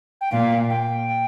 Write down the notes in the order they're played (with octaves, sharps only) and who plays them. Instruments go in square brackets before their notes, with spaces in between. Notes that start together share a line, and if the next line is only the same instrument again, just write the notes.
[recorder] G5
[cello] A#2 [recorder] F5
[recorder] G5